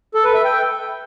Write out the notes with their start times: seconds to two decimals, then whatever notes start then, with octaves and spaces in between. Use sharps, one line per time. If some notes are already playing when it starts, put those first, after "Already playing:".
0.15 A4
0.25 B4
0.35 E5
0.45 G5